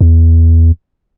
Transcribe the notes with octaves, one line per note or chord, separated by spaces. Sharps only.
E2